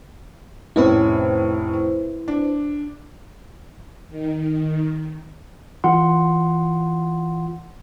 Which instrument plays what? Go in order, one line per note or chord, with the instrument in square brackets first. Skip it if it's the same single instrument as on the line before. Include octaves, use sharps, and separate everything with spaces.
[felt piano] F1 A2 C#4 [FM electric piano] E4 B4 C5
[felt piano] D4
[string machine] D#3
[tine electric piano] E3 F4 F#5 C6